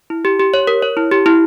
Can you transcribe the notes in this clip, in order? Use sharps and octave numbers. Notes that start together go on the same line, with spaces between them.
E4
G4
G4
C#5
A#4
C#5
E4
G4
E4